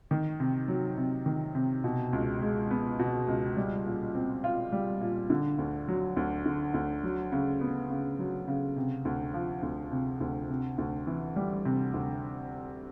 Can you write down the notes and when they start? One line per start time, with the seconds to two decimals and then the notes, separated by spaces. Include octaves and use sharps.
0.11 D#3
0.40 C3
0.68 F#3
0.97 C3
1.26 D#3
1.55 C3
1.84 B2
2.13 C#2
2.42 G#3
2.71 B3
2.99 B2
3.28 C#2
3.57 G3
3.86 A#2
4.15 C4
4.44 F4
4.72 G3
5.01 A#2
5.30 D3
5.58 D2
5.88 F#3
6.17 D2
6.45 D3
6.74 D2
7.03 F#3
7.32 C#3
7.61 B3
7.90 C#3
8.19 F#3
8.48 C#3
8.76 C3
9.05 D2
9.34 F3
9.63 D2
9.92 C3
10.21 D2
10.50 C3
10.78 D2
11.07 E3
11.36 G3
11.65 C3
11.94 D2